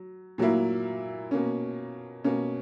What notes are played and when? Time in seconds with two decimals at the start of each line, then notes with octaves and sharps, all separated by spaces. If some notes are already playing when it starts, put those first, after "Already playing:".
Already playing: F#3
0.38 A#2 F#3 A#3 E4
1.31 B2 A#3 C#4
2.24 B2 A#3 C#4